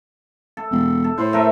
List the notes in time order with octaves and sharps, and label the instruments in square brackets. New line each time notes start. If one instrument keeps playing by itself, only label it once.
[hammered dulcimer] A4
[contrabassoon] E1
[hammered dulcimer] A4
[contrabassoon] A2 [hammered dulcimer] C5
[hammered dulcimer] A3 A#4 E5